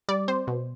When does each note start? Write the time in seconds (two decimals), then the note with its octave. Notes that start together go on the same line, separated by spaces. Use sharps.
0.09 G3 D5
0.28 C4 C5
0.47 B2